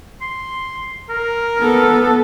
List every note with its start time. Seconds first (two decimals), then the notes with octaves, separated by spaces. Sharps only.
0.21 C6
1.09 A#4
1.59 B3 A4